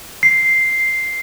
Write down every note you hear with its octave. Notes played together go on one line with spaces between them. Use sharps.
C7